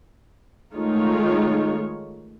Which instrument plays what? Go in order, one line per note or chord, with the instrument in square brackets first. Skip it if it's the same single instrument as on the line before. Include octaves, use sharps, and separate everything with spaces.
[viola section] D#3 G#3 A3 D#4 F4 C#5